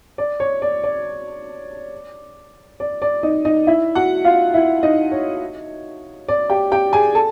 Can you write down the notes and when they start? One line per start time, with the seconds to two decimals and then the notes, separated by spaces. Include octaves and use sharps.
0.18 D5
0.40 C#5
0.62 D5
0.84 D5
2.80 D5
3.02 D5
3.23 D#4 D#5
3.45 D#4 D#5
3.67 E4 E5
3.95 F#4 F#5
4.25 F4 F5
4.54 E4 E5
4.83 D#4 D#5
5.12 C#5
6.28 D5
6.50 G4 G5
6.72 G4 G5
6.93 G#4 G#5
7.15 A4 A5